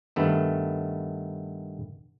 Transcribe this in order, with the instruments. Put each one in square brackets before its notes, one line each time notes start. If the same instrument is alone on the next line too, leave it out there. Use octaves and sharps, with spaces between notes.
[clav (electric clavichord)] G2 D#3 A3 B3